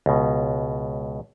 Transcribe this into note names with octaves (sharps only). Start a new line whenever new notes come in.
C#2 B2